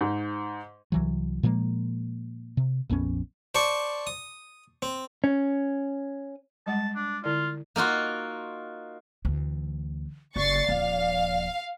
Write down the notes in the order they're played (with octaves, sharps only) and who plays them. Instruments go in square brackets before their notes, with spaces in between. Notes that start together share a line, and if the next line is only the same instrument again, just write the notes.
[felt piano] G#2
[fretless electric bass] C2 E3 F#3
A#2 F3 G#3 A#3
C3
A#1 F2 B3 C#4
[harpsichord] C5 D5 A5 C#6
D#6
C4
[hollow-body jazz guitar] C#4
[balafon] G3 G#3 F#5 [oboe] A5
[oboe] D4
[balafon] D3 E4 D5 [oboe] F4
[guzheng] A#3 D#4 F4 F#4
[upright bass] D2 E3
[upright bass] F#1 [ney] D5 [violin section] C#6 A6 C7
[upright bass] D#1 F3 [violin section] F5